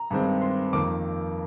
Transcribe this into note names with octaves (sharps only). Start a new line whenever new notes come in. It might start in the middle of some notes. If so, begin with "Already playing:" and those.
Already playing: A#5
G2 D#3 G#3 C4
C6
F2 D#3 A#3 D6